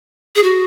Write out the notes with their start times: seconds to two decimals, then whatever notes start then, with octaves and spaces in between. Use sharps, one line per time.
0.36 G#4
0.43 F#4